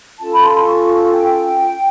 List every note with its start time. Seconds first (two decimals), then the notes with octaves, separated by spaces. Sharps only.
0.20 C#4 F4 A4 A5
0.33 B5
0.43 C6
0.66 C#6
1.13 G5